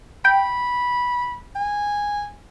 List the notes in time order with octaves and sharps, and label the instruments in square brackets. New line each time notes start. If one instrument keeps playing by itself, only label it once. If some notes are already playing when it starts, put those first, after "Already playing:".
[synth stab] G5 [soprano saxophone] B5
[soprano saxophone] G#5